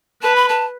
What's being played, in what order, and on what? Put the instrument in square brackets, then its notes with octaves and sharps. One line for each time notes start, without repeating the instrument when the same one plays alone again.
[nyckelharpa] B4 [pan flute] A5
[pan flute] B5
A5